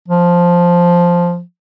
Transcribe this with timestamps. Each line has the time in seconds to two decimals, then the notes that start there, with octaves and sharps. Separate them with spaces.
0.08 F3